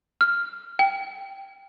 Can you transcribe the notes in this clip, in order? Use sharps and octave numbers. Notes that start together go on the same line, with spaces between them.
F6
G5